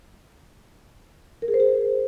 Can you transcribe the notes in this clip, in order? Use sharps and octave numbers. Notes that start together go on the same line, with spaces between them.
A#4
G#4
C5
G#4